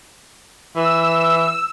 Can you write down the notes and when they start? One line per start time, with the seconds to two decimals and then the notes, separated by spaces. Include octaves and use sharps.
0.76 E3 E6